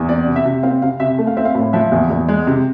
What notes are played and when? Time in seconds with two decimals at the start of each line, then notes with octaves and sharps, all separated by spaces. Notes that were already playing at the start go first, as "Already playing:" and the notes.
Already playing: E2
0.09 C4 D5
0.27 C3
0.36 E5
0.45 C3
0.63 C4 F5
0.82 C3 F5
1.00 C3 E5
1.19 A3
1.27 F5
1.37 C4 E5
1.45 F5
1.55 A2
1.73 F3 E5
1.92 E2
2.10 E2
2.28 G#3
2.47 C3